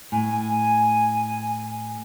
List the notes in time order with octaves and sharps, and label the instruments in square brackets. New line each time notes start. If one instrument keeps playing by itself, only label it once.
[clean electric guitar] A2 [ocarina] G#5